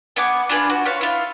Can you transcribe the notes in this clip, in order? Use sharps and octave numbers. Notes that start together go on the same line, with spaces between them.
B3 F#5 G#5 D6
D4 F4 G#4 B4
F#4
F4 B4 C#5
E4 F4